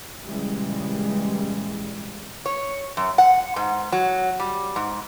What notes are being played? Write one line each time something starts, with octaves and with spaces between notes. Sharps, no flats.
A#2 C#3 E3 G3 G#3
C#5
F#2
F#5
G#2
F#3
G3
G#2